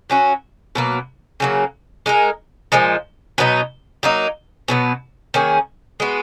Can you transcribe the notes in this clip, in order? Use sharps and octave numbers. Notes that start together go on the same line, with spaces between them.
F#3 C#4 F#4
B2 F#3 A#3
C#3 F#3 A#3
G#3 D#4 A#4
A#2 F3 G#3 D#4
B2 F#3 B3 D#4
F#3 A#3 D#4
B2 F#3 B3
D#3 A#3 C#4 G#4
G#3 B3 F#4